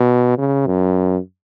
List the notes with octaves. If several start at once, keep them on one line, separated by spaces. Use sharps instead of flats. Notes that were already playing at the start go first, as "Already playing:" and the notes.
Already playing: B2
C#3
F#2